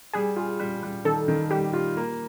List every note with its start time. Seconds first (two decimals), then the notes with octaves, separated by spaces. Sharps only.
0.13 G3 G#4
0.36 F4
0.60 G3
0.83 G3
1.05 D#3 A4
1.28 D#3
1.51 G3 G4
1.73 F4
1.97 A#3